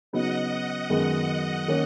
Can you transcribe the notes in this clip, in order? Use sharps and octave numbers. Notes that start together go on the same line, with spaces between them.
C#3 F#3 B3 D#4 D#5 F#5
F#2 D#3 G#3 B3
D#3 A#3 C#4